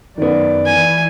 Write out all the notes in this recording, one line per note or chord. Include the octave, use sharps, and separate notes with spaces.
F#2 D#3 B3 D5
E3 G#5